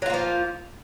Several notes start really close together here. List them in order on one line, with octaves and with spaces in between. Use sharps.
F#3 F4 A#3 F3